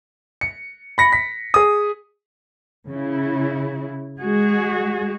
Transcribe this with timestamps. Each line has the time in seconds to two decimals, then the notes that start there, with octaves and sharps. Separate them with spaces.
0.41 C#7
0.98 B5 A#6 C#7
1.13 B6
1.54 G#4 D#6
2.89 C#3 E4
4.19 G#3 F#4 G#4